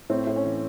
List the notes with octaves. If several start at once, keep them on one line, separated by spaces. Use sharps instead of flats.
A2 C4
A2
C#4
E3